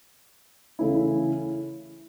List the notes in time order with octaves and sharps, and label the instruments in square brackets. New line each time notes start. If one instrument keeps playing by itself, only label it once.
[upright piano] C#3 E3 A3 C#4 E4